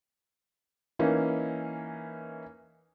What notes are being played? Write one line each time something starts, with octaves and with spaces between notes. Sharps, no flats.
E3 A#3 C#4 D#4 E4